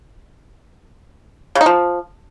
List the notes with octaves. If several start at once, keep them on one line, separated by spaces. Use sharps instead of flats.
C#3
D#4
F3